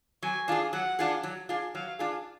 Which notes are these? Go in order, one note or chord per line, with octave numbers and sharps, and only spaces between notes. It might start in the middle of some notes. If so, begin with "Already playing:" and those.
F#3 G#5
D4 F4 G#4
F#3 F#5
D4 F4 G#4
F#3
D4 F4 G#4
F#3 F5
D4 F4 G#4